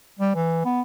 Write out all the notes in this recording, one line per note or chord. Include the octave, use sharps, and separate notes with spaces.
G3
E3
B3